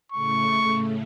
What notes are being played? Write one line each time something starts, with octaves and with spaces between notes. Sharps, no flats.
A2 C#3 A3 C#6